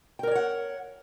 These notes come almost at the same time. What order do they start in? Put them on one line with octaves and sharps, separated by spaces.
G5 A#4 D5 C#5 F#5